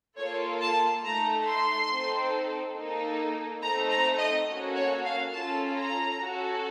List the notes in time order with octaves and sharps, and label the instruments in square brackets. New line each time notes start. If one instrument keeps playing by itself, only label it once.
[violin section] A#3 F4 A4 C#5
A5
A3 D#4 A4 A#5
C6
C4 D#4 A4
A#3 D#4 A4
A3 C4 D#4 A4 A#5
A#5
D#5
A#3 C#4 F#4 A4
C#5
F5
C#4 F4 A4 A5
A#5
C#4 F#4 A4